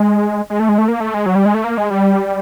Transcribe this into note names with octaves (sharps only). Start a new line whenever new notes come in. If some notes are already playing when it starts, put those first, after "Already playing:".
Already playing: G#3
G#3
A3
G#3
A3
A#3
A3
G#3
F#3
G3
G#3
A3
A#3
G#3
G3